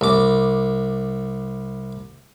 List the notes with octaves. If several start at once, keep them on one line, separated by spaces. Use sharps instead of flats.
C2 D6